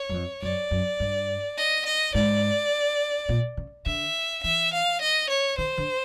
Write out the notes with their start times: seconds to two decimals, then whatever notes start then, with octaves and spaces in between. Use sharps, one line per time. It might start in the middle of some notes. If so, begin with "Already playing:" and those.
Already playing: C#5
0.09 F#2
0.14 F2
0.42 F#2 D5
0.71 F#2
1.00 G2
1.57 D#5
1.86 D#5
2.14 G#2 D5
3.29 A#2
3.57 C#3
3.86 D3 E5
4.43 E3 E5
4.73 F5
5.01 D#5
5.29 C#5
5.58 D#3 C5
5.78 D3